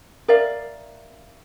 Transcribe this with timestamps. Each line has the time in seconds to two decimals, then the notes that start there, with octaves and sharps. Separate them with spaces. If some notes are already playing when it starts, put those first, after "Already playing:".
0.28 A#4 D5 E5 F5